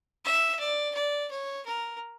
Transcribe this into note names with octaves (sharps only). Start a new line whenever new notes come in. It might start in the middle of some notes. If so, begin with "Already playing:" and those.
E5
D5
D5
C#5
A#4